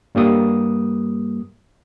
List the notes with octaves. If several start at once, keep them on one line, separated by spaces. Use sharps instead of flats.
G2 G3 A#3 D#6